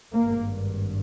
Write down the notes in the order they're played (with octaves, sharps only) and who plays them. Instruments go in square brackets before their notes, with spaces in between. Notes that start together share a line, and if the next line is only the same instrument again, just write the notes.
[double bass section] G#1 G2 A#3